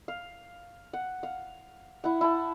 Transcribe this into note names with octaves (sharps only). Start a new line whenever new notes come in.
F5
F#5
F5
E4 F#5
E4 A5